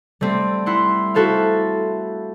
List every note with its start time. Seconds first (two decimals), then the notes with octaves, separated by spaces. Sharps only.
0.21 G3 A3 C4
0.66 E4 F#5 C6
1.14 E4 F#4 A4 C5 F5